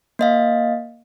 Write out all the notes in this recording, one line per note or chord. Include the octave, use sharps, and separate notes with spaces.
A#3 D#5 F5